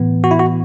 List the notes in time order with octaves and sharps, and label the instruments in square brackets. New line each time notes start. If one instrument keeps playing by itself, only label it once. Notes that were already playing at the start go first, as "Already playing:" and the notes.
Already playing: [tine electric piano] A2 E3 B3
F#4
E4
F#4